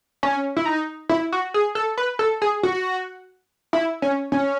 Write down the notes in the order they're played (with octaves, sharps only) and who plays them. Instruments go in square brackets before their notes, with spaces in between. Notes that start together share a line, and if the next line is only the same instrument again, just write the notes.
[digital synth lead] C#4
E4
D#4
E4
F#4
G#4
A4
B4
A4
G#4
F#4
E4
C#4
C#4